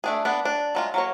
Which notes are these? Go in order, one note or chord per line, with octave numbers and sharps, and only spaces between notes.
A3 D4 G#4
B3 D4
D4
F#3 G#3 F4
F#3 A#3 C#5